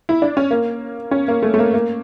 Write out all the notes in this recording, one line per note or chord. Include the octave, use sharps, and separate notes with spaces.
E4
D4
C#4
A#3
C#4
A#3
A3
A3
A#3
A#3